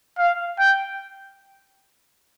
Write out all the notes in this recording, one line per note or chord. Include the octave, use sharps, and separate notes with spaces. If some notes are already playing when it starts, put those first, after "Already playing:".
F5
G5